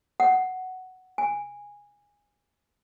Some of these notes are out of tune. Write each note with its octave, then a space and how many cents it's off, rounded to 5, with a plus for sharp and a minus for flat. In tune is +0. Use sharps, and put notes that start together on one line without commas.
F#5 +5
G#5 -15